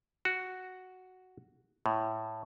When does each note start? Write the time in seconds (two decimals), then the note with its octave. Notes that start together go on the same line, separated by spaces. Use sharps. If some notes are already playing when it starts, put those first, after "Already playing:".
0.25 F#4
1.86 A2